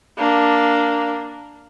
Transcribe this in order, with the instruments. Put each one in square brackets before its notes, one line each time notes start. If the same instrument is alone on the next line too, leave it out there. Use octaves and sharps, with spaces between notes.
[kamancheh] A#3 D4